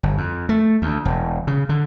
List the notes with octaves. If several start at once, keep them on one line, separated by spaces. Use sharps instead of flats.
G1
F2
A3
D2
E1
C#3
D3